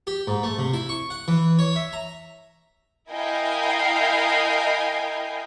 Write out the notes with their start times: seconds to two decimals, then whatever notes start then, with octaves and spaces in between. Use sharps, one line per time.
0.07 G4
0.27 G#2
0.43 A3
0.58 C3
0.74 E4
0.89 C#6
1.10 F#5
1.28 E3
1.59 C#5
1.76 E5
1.93 A#5
3.10 E4 A#4 D#5 F5 G5 G#5